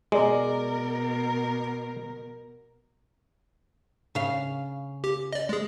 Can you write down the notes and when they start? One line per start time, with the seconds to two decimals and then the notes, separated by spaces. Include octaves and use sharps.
0.12 B2 G#3 A#4 D5
4.15 C#3 F5
5.04 G4
5.33 D5 D#5
5.49 G#3 G#4